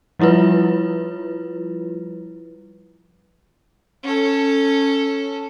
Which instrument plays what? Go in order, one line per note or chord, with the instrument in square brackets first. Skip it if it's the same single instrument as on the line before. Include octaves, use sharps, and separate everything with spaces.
[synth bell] F3 G3 E4 F4 B4
[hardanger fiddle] C#4 A4